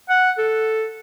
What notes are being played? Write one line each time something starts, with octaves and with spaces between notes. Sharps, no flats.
F#5
A4